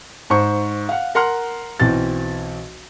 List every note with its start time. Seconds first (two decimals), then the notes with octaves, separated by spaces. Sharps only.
0.30 G#2 C5 C#6
0.89 F5 F#5
1.15 A#4 F#5 A#5 C6 F6
1.80 B1 E3 C4 F#4 A6